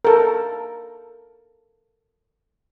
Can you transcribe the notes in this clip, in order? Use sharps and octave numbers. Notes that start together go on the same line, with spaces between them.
A4 A#4